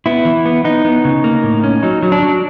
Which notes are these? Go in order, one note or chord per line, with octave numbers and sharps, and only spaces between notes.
B3 E4
E3
B3
B3 D#4
B3
C#3
A#3
A2
C#4
F#3 D#4
F#3
D4
F#3